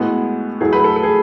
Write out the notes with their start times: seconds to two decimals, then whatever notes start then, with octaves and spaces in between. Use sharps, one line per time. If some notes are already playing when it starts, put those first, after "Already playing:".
Already playing: A2 G#3 B3 F#4
0.60 A2 F#3 A3 G#4
0.73 B4
0.84 A4
0.96 A4
1.03 G#4